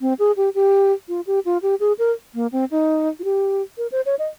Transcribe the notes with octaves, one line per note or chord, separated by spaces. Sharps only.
C4
G#4
G4
G4
F4
G4
F4
G4
G#4
A#4
A#3
C4
D#4
F4
G4
A#4
C5
C#5
D#5